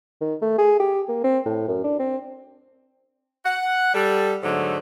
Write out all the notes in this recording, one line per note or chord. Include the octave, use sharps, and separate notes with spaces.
D#3
A3
G#4
G4
A#3
C4
A2
F#2
D4
C4
F#5
G3 A4
G#2 D3 F#3 A3